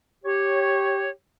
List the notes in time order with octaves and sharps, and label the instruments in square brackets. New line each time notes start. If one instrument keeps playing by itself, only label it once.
[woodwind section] G4 C#5